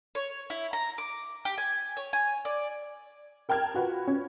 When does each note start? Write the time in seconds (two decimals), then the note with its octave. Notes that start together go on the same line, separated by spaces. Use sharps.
0.15 C#5
0.50 E4
0.73 A#5
0.98 D6
1.45 G4
1.58 G#5
1.97 C#5
2.13 G#5
2.45 D5
3.49 A#4 G5 A5 F6 G#6
3.74 F4 F#4 B4
4.07 C#4